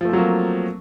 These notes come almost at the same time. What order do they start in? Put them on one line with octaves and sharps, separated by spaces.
F3 A3 C4 F#3 A#3